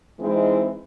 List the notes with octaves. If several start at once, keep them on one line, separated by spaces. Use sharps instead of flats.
E3 G#3 C4 D#4 E4